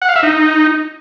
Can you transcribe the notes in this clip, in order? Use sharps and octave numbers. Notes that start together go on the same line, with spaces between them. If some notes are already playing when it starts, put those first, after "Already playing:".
F#5
F5
E5
D#4